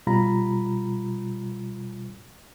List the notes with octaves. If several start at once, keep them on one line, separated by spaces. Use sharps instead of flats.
B2 G3 F4 A#5 B5